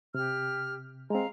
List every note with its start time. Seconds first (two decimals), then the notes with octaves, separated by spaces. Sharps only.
0.15 C3 G4 F6
1.10 G#3 C4 F5 A#5